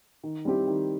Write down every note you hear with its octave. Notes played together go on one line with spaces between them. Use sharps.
D#3
G3 C4 E4 G4
D#3